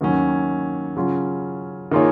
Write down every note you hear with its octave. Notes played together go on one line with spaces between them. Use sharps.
D#2 D#3 F#3 C#4
C#3 F#3 C#4 F4
D#3 A#3 F4 G#4 C#5